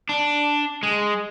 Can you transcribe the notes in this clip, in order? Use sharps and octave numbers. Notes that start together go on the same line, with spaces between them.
D4
G#3